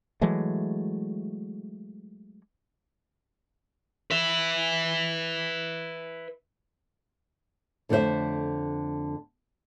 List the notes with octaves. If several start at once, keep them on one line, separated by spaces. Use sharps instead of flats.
E3 F#3 G#3 A3
B4 E5
F2 D3 A3 C4 C5 E5